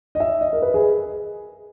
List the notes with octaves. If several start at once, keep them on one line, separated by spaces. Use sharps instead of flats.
D#5
E5
D#5
A#4
B4
G#4